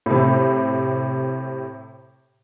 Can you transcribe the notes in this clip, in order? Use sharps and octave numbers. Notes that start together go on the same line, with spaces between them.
A2 C3